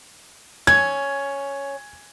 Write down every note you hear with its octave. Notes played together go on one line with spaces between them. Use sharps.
C#4 G#6